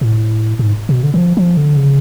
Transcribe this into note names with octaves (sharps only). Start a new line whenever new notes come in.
A2
G#2
B2
D3
D3
F3
F3
D3
C#3